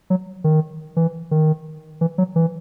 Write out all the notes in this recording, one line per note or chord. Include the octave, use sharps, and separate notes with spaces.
F#3
D#3
E3
D#3
E3
F#3
E3